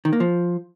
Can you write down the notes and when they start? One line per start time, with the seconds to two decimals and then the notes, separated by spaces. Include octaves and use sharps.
0.05 D#3
0.13 A#3
0.20 F3